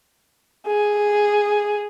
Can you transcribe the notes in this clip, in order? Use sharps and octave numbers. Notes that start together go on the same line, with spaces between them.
G#4